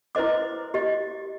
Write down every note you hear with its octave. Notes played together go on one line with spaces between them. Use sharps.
E4 B4 C5 D#5 D6
G4 D#5